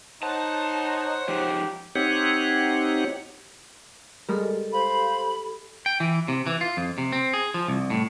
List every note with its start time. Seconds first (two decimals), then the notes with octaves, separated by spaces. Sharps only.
0.23 D#4 C5 C#5 F#5 A5
1.28 F3 G#3 D#4 G4
1.95 C4 D#4 G4 C#5 F#5
4.29 G3 G#3 G4 A4 A#4
4.73 C5 F5 B5
5.86 G5
6.00 E3
6.28 C3
6.47 E3
6.61 F4
6.77 F2
6.98 C3
7.12 C4
7.33 G#4
7.54 F3
7.68 C2
7.90 A2